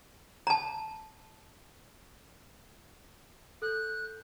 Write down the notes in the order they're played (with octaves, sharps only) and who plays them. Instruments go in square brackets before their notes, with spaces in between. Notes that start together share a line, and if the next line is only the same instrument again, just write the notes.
[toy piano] A5 A#5
[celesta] A4 G6 [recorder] F#6